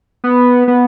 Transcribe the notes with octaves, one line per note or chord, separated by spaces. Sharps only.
B3
B3